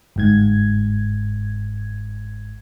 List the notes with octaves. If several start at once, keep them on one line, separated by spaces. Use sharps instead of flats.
G1 G#2 G#6